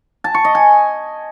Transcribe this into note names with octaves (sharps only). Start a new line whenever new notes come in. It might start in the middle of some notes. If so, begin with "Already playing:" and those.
A5
C#6
D#5
G#5